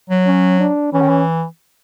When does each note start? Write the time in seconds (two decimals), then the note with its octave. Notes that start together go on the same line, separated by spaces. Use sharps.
0.10 F#3
0.26 C#4
0.60 D4
0.93 E3 C#4
1.01 D#3
1.09 E3